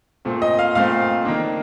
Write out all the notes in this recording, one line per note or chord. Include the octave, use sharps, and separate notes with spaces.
A#2 A3 C4
D#5
F5
A#2 A3 C4 F5
D#3 A#3 D4